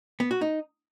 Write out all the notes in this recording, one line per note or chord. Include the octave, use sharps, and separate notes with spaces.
B3
F#4
D#4